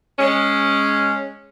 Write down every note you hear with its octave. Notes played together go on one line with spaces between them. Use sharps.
G#3 C#4